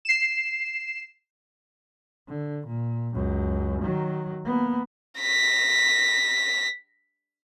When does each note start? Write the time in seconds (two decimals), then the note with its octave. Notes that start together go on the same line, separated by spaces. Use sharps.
0.05 C7 E7
2.29 D3
2.67 A#2
3.14 C#2 F#2
3.82 D#3 F#3
4.45 A#3 B3
5.20 A#6 B6